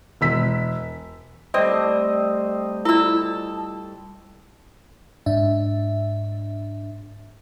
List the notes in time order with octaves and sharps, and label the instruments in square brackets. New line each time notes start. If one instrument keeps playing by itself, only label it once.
[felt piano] E1 E6 B6
[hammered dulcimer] G3 A3 [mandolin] C4 [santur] C5 D#5 [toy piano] D5
[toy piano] E4 F4 D5 [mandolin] A4 E6
[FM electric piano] G#2 D4 E5